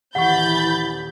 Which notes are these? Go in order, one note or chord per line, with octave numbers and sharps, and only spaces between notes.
D#1 E3 F#5 B5 C#6 G6 A6